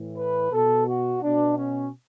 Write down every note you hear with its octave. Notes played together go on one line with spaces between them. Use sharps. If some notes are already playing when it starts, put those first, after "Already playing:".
Already playing: A2 E3
B4
B2 A4
F#4
B2 D4
C#4